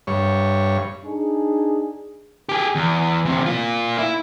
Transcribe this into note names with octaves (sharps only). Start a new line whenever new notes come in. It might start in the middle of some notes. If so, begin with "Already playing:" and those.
G2 C#5
D4 D#4 G#4
G4 G#4
E2
E2 C3
A#3 F4
E4